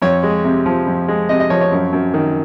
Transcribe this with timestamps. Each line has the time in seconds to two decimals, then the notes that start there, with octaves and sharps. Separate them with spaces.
0.02 F2 C#5
0.23 G#3
0.44 C3
0.66 F3
0.87 F2
1.08 G#3
1.29 C3 D#5
1.40 D#5
1.50 F3 C#5
1.61 C#5
1.72 F#2
1.93 F#2
2.14 D#3